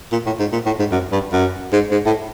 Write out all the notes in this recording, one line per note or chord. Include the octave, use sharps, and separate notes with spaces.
A#2
A2
G#2
A#2
A2
G#2
F#2
G2
F#2
G#2
G#2
A2